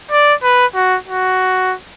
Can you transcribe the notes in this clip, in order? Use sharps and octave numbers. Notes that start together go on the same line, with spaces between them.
D5
B4
F#4
F#4